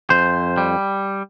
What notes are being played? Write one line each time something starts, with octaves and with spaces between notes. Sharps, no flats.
F2 C5
G3